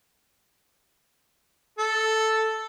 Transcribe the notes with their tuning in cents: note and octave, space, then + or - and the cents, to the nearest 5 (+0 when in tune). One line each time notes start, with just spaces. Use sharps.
A4 +0